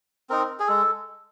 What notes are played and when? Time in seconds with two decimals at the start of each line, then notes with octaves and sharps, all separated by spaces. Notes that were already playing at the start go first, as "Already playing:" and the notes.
0.30 C4 D#4 A#4
0.60 G#4
0.68 G#3 A4